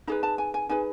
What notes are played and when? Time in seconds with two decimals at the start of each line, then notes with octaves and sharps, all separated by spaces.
0.07 D#4 G#4 B4 A#5
0.23 A5
0.38 G#5
0.54 G#5
0.69 D#4 G#4 B4 G#5